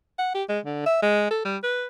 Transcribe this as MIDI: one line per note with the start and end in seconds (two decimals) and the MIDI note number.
0.18 0.30 78
0.35 0.44 67
0.49 0.59 56
0.65 0.84 50
0.86 0.99 76
1.02 1.28 56
1.31 1.43 69
1.45 1.57 55
1.63 1.86 71